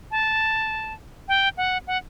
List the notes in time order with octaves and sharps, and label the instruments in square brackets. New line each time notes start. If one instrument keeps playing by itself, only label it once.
[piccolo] A5
G5
F#5
F#5